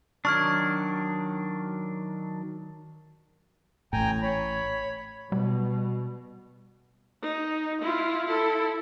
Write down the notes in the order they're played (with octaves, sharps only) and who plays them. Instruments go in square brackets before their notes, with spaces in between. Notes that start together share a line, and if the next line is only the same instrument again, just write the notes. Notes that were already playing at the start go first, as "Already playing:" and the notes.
[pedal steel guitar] D#3 F#3 D4 [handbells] C#6 F6 G#6
[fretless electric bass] A1 A2 [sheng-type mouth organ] G5 G#5 A#5
[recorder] C#5 [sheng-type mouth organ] B5
[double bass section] B2 [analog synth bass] G3
[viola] D#4
E4 F4
E4 A4